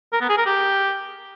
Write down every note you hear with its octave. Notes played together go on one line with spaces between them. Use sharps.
A#4
B3
G#4
A#4
G4